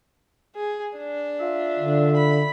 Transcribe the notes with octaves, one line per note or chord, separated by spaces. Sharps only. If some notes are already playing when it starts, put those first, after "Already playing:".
G#4
D4
F4 E5
D3
B5